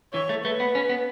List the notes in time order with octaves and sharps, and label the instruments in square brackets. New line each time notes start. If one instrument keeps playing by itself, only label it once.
[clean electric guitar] E3 [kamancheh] C#5
[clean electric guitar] A3
[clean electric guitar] A3 [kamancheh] B4
[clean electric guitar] B3
C#4
B3